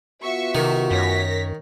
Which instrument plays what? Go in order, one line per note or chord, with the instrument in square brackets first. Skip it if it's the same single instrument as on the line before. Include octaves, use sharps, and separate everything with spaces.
[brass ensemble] B3 F4 F#4 [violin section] E5 C#6
[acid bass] C3 [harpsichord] D#3
[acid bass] F#2 [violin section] C#5 A#6 B6